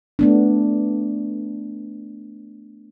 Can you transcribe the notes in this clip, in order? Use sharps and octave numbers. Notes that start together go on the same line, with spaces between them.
A3 B3 D4